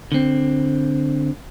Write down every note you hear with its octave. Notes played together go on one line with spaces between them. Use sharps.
D3 C4